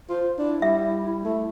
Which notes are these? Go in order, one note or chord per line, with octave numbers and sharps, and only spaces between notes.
F4 C5
D4 E4
G3 E5
A3